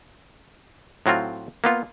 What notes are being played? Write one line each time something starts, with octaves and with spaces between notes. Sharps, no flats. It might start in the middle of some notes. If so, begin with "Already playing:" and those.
A2 F#3 C4 F4
A#3 B3 F4